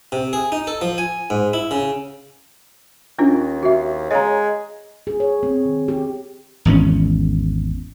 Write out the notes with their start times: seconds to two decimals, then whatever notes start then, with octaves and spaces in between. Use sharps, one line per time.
0.12 C3
0.33 G#4
0.52 D#4
0.67 A4
0.81 F3
0.98 G#5
1.30 G#2
1.53 E4
1.71 C#3
3.19 D#2 C#4 D4 F4
3.63 F#4 E5
4.11 G#3 C#5 F5 A#5
5.07 G#4
5.20 C#5
5.43 C4
5.65 D#3
5.88 G4
6.65 G#1 E2 C#3 C#4